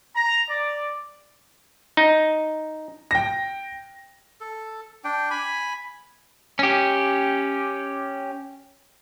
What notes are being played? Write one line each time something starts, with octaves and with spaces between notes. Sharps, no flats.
A#5
D5
D#4
G5 A#6
A4
D4 G5
G#5 B5
C#4 G4